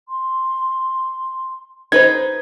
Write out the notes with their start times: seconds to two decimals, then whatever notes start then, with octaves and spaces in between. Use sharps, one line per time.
0.09 C6
1.92 D#4 B4 C5 G#6